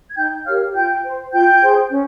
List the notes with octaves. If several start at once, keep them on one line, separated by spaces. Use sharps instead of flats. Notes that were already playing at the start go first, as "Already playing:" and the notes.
G#6
D#4 G5 G6
G4 A#4 C#5 F5 F6
F4 G5 G6
C5
F4 G5 G6
G#4 C5
C#4